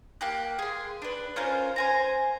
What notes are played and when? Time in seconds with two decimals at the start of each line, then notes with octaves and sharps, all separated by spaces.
0.21 A#3 G4 F#6
0.59 G#4 C6
1.02 D4 B4
1.36 C#4 F4 A#4 C5
1.76 C5 G#5 A#5